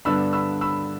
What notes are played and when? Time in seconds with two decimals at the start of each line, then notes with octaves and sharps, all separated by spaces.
0.05 G2 D3 B3 D4 B5 E6
0.33 B5 E6
0.61 B5 E6